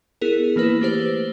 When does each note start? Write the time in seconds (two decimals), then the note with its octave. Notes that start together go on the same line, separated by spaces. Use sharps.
0.21 B3 E4 G#4 A#4
0.56 E3 A#3 E4 B4
0.81 A3 G4 C5 F#7